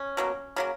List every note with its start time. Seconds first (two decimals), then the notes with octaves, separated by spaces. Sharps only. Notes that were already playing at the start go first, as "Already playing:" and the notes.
Already playing: C#4
0.17 B2 F#3 A#3
0.56 C#3 F#3 A#3